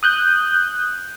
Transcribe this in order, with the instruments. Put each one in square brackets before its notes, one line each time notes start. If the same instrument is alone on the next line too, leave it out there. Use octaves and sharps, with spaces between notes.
[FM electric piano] D#6 F#6 G6